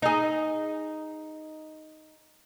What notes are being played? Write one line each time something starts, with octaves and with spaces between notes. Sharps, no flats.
D#4 G#4